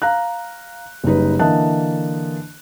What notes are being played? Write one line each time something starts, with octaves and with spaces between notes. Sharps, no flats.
F5 A#5 F#6
F#1 G3 D#4 B4
D3 E3 A#3 D#5 A5 F#6